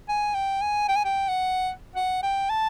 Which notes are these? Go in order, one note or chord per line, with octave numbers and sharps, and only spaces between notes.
G#5
G5
G#5
G5
G#5
G5
F#5
F#5
G5
A5